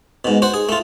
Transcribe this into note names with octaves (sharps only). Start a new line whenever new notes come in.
G#2 B2
F#4 C5
G#4
A3 F4